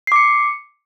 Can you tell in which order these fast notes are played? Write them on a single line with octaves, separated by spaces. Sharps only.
C7 D6 C#7